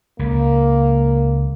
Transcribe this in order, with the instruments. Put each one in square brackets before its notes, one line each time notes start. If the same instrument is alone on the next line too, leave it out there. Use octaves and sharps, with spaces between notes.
[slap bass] C#2 C#3 [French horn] A#3